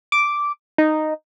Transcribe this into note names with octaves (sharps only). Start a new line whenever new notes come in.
D6
D#4